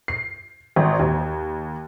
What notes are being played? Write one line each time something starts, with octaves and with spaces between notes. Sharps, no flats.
C7
G#1
D#2